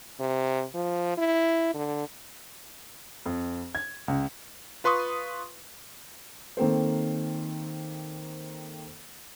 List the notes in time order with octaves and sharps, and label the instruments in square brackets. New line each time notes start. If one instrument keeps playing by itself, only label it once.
[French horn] C3
F3
E4
D3
[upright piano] F2
G#6
C#2
[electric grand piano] F4 B4 C6 C#6 D#6
[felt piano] D#3 A#3 C4 A4 C5